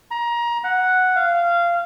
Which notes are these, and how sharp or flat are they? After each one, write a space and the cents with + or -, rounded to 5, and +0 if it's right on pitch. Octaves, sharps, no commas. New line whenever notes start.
A#5 +25
F#5 +0
F5 -15